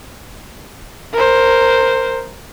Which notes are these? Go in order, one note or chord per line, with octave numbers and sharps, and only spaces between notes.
A#4 C5